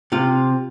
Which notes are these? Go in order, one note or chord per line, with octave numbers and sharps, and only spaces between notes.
C3 F4